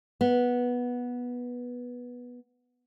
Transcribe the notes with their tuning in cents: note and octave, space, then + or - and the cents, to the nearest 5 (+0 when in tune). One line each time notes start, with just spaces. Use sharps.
B3 -10